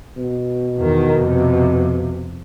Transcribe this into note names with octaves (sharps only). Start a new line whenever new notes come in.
B2
E2 D#3
F2 C3